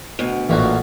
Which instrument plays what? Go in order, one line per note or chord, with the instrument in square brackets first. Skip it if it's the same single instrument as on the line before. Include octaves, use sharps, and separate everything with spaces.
[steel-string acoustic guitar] D2 B2
[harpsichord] A1 A#2 F#4